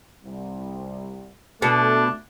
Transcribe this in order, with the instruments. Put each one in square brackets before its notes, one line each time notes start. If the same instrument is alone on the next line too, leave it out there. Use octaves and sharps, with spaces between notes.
[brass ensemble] C2
[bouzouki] B2 [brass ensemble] A3 [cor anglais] D4